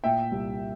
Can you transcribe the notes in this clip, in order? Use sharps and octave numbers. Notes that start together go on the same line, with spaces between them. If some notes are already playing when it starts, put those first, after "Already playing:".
A#2 E5 G5
C2